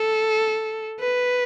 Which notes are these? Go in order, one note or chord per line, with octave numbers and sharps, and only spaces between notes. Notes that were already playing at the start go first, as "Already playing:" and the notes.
Already playing: A4
B4